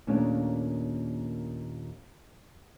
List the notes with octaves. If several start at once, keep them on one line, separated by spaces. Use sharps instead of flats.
D#2 A#2 A3 C#4 D4